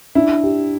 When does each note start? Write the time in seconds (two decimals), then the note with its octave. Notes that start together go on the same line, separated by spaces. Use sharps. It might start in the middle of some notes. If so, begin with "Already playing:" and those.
0.15 D4 E4
0.43 G4